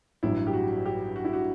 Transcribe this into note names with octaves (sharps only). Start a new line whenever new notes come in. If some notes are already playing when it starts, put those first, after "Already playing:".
A1 G2 F#3 E4
G4
F#4
G4
F#4
E4
F#4